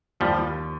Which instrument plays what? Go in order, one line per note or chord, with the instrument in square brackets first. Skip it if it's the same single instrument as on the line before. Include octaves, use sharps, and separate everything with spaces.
[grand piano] D#2 [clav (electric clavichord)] F3 G3